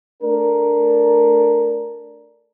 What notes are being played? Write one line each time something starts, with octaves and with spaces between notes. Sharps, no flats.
A3 D4 A#4